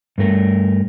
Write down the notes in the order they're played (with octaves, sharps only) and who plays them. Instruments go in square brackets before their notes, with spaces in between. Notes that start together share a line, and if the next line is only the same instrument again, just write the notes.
[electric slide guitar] G2 A3 A#4